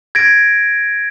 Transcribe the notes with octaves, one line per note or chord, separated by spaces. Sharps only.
G#6 A#6 D7